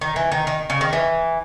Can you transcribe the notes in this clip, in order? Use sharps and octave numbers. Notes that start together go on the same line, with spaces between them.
D#3
E3
D#3
D#3
C#3
D#3
E3